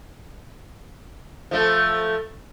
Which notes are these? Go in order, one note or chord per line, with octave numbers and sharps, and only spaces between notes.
F3 A3